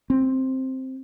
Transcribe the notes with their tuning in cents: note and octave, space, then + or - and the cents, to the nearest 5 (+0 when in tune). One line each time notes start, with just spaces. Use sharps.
C4 +5